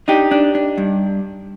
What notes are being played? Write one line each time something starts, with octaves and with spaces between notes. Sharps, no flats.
D4 D#4 G4
D4
D4
G2